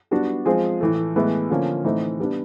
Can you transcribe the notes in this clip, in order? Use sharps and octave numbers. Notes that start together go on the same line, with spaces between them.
G3 B3 D4 F#4
F3 G#3 C4 F4 G#4
A2 E3 A3
A2 E3 G#3 B3
D3 F3 A#3 C#4 F4
A2 E3 A3 C4 D#4
G3 B3 D4